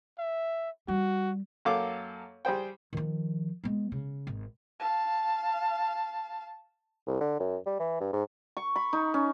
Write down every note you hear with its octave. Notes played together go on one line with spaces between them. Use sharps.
E5
G3 F#4
F#2 A#3 A4 F5 D6
G3 G#4 C5 G5
D#3 F3
G#3 B3
C#3
G#1
F5 A5
C2
D3
F#2
G3
E3
G2
G#2
C#6
B5
D#4
C#4